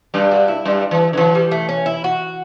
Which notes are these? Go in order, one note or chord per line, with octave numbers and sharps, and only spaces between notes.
G2 G3 G4
F#4
E4
G2 G3
E3
D3
E3 F#3
G3
A3
C#4
E4
F#4